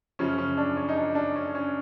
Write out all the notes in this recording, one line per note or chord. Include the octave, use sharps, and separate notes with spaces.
F#2 C#3 F3 C#4
C#4
D4
C#4
D#4
D4
D4
C#4
C#4